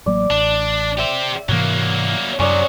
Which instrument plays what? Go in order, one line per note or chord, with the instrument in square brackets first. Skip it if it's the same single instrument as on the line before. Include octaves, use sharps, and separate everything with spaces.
[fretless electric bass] A1 F#3 A#3 [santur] D5
[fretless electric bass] A1 [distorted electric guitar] D4
[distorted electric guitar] G4 C5 [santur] E5
[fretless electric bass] G#2 C3 E3 [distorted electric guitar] F#3 A#3
[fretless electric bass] F#2 [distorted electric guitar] C3 F#3 [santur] C#4 D5 D#6